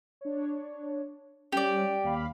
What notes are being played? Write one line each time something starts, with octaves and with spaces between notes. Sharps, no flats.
D4 C#5
G3 C#4 G4 D5
D#2 F5 B5